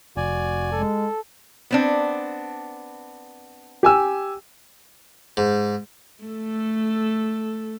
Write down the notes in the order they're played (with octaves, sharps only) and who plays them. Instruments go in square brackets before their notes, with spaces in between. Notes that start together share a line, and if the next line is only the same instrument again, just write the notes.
[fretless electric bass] F1 [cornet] F#4 [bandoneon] D5 G#5
[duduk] G#3 [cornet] A4
[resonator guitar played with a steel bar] B3 C4 D4
[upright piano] G4 G#5 E6
[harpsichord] G#2
[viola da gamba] A3 A4